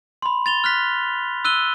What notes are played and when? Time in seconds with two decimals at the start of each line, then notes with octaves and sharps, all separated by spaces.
0.22 B5 C6
0.46 A6 F7 G7
0.64 F6 F#6 B6
1.45 E6 F#6 D#7 G7